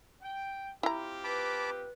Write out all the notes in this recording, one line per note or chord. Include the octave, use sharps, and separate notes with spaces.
G5
C4 E4 F4 G4 A#5
B4 A5 B5 D6